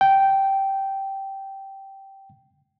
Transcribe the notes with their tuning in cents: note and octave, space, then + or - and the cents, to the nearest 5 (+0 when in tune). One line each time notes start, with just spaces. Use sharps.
G5 -10